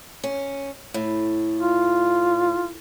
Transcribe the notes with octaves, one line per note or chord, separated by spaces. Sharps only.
C#4
A2
F4